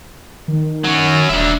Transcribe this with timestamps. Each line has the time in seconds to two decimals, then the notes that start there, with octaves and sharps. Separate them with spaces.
0.48 D#3
0.85 F#3 C#4
1.29 D#1 D4 E5